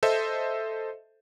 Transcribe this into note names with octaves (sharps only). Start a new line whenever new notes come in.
A4 C5 D#5 E5